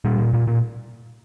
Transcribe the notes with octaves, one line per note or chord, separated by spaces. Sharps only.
A#2 G3
A#2
A#2
A#2